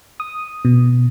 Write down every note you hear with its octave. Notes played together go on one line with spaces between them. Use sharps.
D#6
B2